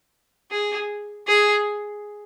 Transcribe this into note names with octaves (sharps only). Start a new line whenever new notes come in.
G#4
G#4